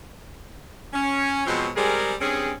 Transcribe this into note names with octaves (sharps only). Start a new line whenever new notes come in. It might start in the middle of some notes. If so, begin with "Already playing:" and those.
C#4
B2 F3 F#3 G#3 B3 C4
G3 G#3 C4 G#4 A#4
G2 C4 C#4 G#4